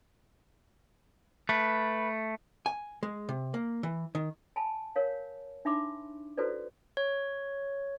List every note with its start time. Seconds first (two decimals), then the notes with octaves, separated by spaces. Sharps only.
1.49 A3 B4
2.66 G#5
3.03 G#3
3.29 C3
3.54 A#3
3.83 E3
4.15 D#3
4.56 G#5 A5 B5
4.96 A#4 C#5 F5
5.65 D4 D#4 E5 B5 C6 D6
6.37 E4 F#4 A4 B4 C5 D5
6.97 C#5